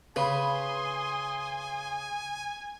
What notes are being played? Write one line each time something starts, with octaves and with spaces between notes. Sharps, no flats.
C#3 B4 G#5 C6 D#6